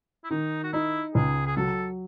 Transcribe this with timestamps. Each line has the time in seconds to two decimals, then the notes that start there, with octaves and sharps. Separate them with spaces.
0.24 E4
0.30 D#3 D#4
0.64 F#4
0.73 D#4 E4
1.15 C#2 G#4
1.47 G#4
1.57 F#3 A4